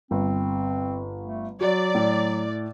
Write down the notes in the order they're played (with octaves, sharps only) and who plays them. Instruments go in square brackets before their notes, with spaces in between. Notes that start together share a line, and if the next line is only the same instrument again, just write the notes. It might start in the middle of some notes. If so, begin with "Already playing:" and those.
[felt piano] G1 [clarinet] C4
[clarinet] A3
[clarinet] F#3 [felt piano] F#4 [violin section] D5
[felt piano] A2